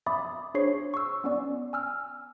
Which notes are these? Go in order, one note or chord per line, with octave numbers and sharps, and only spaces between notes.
E5 B5 D6 D#6 A6
D4 G#4 C5 C#5 C#6 C7
C#6 E6
B3 C#4 D5
G#5 E6 F6